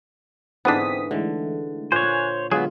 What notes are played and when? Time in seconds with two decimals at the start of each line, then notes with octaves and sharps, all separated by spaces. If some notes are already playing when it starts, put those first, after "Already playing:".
0.65 G#2 D3 E3 B3 C4 D4 D#6 B6
1.11 D3 E3 G#3 A3
1.92 A#2 C5 C#5 G#5 F#6
2.51 D3 F#3 G#3 B3 F4 G#4